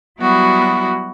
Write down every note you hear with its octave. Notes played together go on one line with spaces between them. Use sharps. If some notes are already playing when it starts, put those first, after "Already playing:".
F#3 G3 B3 E4 F#4